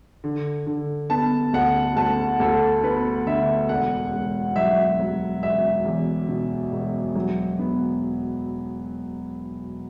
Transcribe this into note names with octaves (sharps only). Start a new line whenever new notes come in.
D3
D3
B3 A5
D2 F#5
D2 A5
D2 A4
B3 B4
D3 E5
E1 F#5
E1
F#3 E5
F#3
E1 E5
E2
B2
E1
F#3
B3